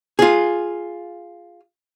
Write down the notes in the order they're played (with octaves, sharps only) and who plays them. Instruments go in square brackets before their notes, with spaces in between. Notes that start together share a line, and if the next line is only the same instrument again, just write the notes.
[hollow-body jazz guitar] F4 G#4